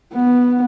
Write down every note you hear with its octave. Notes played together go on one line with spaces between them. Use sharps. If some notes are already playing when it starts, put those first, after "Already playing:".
B3